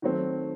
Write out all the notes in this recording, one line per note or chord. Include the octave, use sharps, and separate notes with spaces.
D#3 F#3 A3 C4